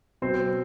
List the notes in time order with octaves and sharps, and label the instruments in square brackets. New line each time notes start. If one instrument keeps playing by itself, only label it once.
[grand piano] B2 F#3 B3 C4 C5